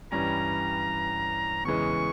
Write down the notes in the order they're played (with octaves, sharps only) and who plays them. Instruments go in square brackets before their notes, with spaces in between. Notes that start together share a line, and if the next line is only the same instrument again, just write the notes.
[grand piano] G2 E3 G3 C#4 [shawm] A#5
[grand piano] E2 C#3 E3 G#3 [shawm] C#6